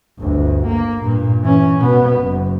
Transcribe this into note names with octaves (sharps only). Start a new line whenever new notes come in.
G1 D2
A#3
G2 A#2
E3 C#4
B2 B3
F#1